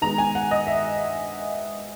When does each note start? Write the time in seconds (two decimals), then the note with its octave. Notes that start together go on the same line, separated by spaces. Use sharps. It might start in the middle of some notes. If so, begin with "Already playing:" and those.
0.01 D#3 G#3 B3 A#5
0.18 G#5
0.35 F#5
0.51 D#5
0.67 E5